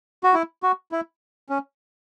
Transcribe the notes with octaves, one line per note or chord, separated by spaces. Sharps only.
F#4
E4
F#4
E4
C#4